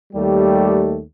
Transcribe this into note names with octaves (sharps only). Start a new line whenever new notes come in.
D#2 G3 A3 G4